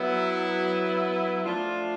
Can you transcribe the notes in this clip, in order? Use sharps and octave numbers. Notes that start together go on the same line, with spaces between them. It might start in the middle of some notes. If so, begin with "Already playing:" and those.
Already playing: F#3 B3 E4
F3 A3 D4 F4